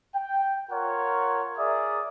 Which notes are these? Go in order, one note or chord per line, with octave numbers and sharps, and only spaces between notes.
G5
F4 A#4 C#5 F#5
G#4 A#4 D5 E5 D#6